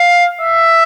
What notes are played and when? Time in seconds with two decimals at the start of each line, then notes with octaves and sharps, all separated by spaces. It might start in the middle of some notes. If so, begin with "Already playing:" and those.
Already playing: F5
0.41 E5